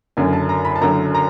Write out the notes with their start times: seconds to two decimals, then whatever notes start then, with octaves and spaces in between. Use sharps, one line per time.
0.17 F#1 F#2 D3 G#5
0.33 A5
0.49 A#5
0.65 B5
0.75 A5
0.81 F#1 F#2 D3 A#5
1.15 A#5